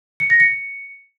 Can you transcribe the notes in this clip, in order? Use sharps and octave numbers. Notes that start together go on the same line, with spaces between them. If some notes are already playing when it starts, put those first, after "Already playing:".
C#7
A#6
C#7